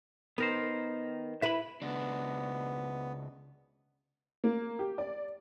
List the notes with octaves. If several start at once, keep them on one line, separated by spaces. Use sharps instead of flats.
D#3 B3 A#4 C5
E4 B4 E5 B5
C#2 B3 D4
A#3
G4
D5